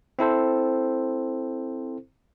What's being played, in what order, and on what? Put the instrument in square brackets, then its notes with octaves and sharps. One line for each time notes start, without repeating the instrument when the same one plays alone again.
[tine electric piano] C4 E4 A4 C5